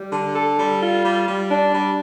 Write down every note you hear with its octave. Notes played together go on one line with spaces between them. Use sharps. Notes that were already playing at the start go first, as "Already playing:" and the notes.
Already playing: G3
D3
A4
G3
F4
G3
G3
D4
G3